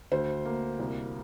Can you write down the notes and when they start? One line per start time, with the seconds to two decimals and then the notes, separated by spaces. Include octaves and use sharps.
0.12 D2 C5
0.45 A#3
0.79 C2